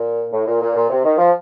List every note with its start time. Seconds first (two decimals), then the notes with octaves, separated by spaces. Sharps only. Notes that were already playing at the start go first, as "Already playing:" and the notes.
Already playing: A#2
0.33 A2
0.47 A#2
0.61 A#2
0.76 A#2
0.90 C3
1.04 D#3
1.18 F3